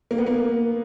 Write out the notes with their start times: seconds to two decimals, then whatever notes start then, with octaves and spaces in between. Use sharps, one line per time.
0.11 A#3
0.18 B3
0.26 A#3